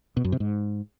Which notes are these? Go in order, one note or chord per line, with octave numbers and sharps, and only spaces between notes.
B2
F#2
C3
G#2